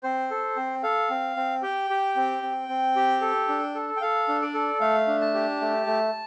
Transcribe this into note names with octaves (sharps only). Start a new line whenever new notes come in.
C4 C5
A4
C4
A4 F5
C4
C4
G4 G5
G4
C4
C4
C4
G4
A4
D4
A4
G5
A4 F5
D4
D5
A4
A3 F5
D4
A5
G4
A3
A3